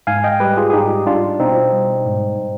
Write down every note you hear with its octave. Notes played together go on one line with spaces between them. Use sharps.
G#2 F5 G#5
D#5 G5
G3 G4 B4
F4 G#4
G#4
G#2 D#4 G4
G3 D4 F4
B2 C4 D#4
G3
G#2